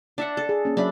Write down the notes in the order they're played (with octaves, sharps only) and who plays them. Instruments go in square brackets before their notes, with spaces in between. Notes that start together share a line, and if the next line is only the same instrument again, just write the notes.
[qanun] D4 E5 F#5
A4
[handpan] G#4
A#3 C#4
[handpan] F#3 D5 E5 [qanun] D4 B5